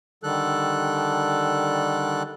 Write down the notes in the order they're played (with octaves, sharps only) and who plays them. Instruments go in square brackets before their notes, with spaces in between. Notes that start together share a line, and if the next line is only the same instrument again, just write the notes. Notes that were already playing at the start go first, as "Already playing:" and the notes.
[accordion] D3 D#3 G3 A4 F#6